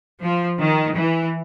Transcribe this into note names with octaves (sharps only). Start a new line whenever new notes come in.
F3
D#3
E3